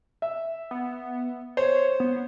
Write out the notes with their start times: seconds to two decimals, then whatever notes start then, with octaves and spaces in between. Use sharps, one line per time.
0.22 E5
0.71 B3
1.57 C5 C#5
2.00 B3